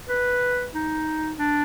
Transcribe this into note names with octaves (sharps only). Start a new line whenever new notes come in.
B4
D#4
D4